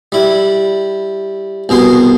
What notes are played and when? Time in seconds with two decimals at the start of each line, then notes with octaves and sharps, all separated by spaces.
0.12 G3 E4
1.69 C2 B2 G#4 C6